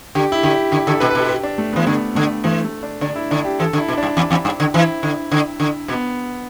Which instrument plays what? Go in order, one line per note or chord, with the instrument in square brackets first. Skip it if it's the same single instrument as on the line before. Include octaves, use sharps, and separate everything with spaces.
[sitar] D3 [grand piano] G4
[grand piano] E4
[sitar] D3 [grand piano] G4
[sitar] D3 [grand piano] G4
[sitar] D3 [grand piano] A4
[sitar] B2 [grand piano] B4
[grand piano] B4
[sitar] B2 [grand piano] A4
[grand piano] G4
D4
A3
[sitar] E3 [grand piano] B3
[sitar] D3 [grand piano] A3
[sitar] D3 [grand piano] A3
[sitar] E3 [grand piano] A3
[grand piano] A3
D4
[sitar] D3 [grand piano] D4
[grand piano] E4
[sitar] D3 [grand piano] D4
[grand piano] G4
[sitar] E3 [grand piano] A4
[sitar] D3
[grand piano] E4
[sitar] B2
[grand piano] D4
[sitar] G2
E2
E2
G2
D3
[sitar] E3 [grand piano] E4
[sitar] D3
D3
D3
[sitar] B2 [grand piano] B3